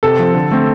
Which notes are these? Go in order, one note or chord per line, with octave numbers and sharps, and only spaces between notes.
C3 A4
F3 C4
D3
A3 C4